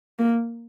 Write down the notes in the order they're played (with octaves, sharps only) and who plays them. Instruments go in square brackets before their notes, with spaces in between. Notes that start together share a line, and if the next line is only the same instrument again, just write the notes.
[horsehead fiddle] A#3